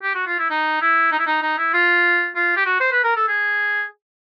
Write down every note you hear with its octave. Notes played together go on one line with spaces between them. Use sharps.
G4
F#4
F4
E4
D#4
E4
D#4
E4
D#4
D#4
E4
F4
F4
G4
F#4
C5
B4
A#4
A4
G#4